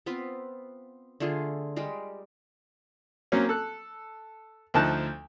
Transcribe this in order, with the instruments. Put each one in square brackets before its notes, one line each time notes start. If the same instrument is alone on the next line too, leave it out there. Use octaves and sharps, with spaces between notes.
[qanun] B3 C4 F4 B4
D3 A3 F4 G#4
G3 G#3 G4 A#4
[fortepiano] F#3 A#3 C4 C#4
A4 F#6
D2 F3 D#4 A5 F#6